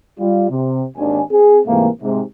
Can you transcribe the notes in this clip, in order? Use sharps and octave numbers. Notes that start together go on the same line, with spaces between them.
G3 F4
C3
G#1 D#2 D4 G#5
C4 G#4
G#2 C3 E3 A3 A#3
G#2 C3